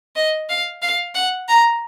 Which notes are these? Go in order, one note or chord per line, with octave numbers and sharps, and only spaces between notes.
D#5
F5
F5
F#5
A#5